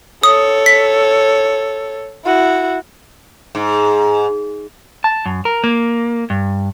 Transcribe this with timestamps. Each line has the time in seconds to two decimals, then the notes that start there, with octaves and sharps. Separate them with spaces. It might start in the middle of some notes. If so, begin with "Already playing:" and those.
0.23 A4 C#5 D#6
0.66 B6
2.25 E4 F#4
3.55 G#2
5.04 A5
5.26 F#2
5.45 A#4
5.64 A#3
6.30 G2